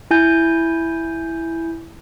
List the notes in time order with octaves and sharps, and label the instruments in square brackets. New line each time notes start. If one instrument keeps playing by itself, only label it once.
[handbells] E4 G#5 G6